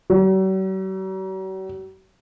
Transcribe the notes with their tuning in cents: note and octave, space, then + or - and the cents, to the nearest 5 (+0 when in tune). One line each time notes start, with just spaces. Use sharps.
F#3 +45